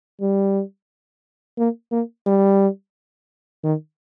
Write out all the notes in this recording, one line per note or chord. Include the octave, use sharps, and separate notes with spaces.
G3
A#3
A#3
G3
D#3